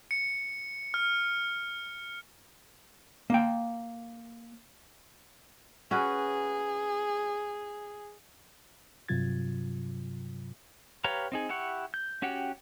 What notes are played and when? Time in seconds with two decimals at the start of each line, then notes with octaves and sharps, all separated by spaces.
0.11 C#7
0.94 F6
3.30 A#3 G5
5.91 C#4 F#4 G#4 B4
9.08 G2 C3 F#3 F4 G#6 A6
11.04 G4 B4 C#5 F5 A#5
11.32 C4 D#4 G#4
11.49 E4 G4 F#5 C#6
11.94 G6
12.22 C#4 F#4 G4 F#5 G5